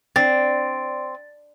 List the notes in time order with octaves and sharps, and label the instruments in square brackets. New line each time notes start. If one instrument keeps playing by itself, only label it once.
[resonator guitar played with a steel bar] C4 [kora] D4 [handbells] D5 D7 [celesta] A6